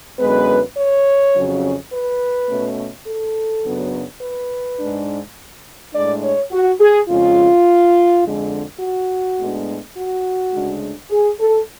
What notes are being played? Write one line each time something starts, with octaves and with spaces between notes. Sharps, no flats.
F#2 D3 G#3 B3 B4
C#5
F2 C#3 F#3 C#4
B4
B2 A3 C#4
A4
F#2 C#3 F#3 B3 D4
B4
G#2 G#3 D4
A2 G#3 D4 D5
C#5
F#4
G#4
F2 C#3 G#3 F4
F2 D3 G#3
F#4
A2 G#3 B3 D4
F#4
D2 C#3 G#3 D4
G#4
A4